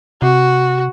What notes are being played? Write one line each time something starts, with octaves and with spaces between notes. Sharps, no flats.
C3 F#4